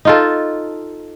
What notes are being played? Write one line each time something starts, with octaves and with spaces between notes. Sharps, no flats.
D#4 F4 A4